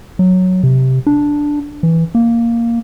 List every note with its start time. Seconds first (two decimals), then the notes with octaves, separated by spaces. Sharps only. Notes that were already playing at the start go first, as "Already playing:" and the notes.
0.19 F#3
0.63 C3
1.07 D4
1.83 E3
2.15 A#3